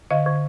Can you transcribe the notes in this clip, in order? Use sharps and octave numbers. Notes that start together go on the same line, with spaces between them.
D3 D#5 F5
D3